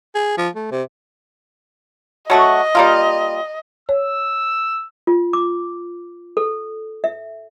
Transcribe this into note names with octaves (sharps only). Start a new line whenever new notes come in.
G#4
F3
A3
C3
F#3 A3 F#4 D#5
G3 A#3 F4
C#5 E6
F4
D6
A4
E5